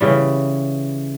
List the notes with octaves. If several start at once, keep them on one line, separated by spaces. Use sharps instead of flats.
C#3 E3 G3